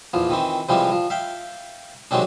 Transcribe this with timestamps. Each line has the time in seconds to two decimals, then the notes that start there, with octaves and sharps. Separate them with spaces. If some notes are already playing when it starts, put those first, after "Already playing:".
0.14 A#1 E2 F3
0.30 D#3 E3 C4
0.69 C3 E3 F3 G3 G#3 C4
0.92 F3
1.10 E5 F5 G5
2.11 C3 D#3 F#3 G#3 C4 D4